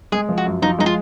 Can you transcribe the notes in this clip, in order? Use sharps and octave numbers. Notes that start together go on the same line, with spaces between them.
G#3 G#4
F3
F#4
F#2
F3 D#4
G#3 D#4
F4